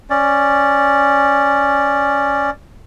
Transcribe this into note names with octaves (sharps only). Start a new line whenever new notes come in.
C#4 D5